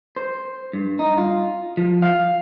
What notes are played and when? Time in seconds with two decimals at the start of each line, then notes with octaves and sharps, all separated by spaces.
0.16 C5
0.73 G2
0.99 D#4
1.18 F4
1.77 F3
2.02 F5